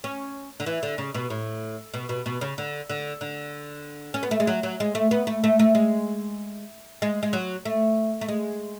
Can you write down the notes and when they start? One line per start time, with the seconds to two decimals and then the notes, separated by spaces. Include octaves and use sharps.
0.04 C#4
0.60 D3
0.66 E3
0.83 D3
0.98 C#3
1.15 B2
1.30 A2
1.94 B2
2.09 B2
2.26 B2
2.41 C#3
2.58 D3
2.90 D3
3.21 D3
4.14 C#4
4.23 B3
4.31 A3
4.40 G#3
4.47 F#3
4.63 F#3
4.80 G#3
4.95 A3
5.11 B3
5.27 A3
5.44 A3
5.59 A3
5.75 G#3
7.02 G#3
7.23 G#3
7.33 F#3
7.65 A3
8.21 A3
8.28 G#3